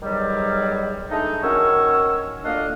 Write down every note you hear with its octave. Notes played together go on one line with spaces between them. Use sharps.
E2 D#3 F#3 G3
G#3 A3 D4 D#4
D#3 F#3 C#4 A#4 C#5 E6
D2 A#2 A#3 D4 D#5 F5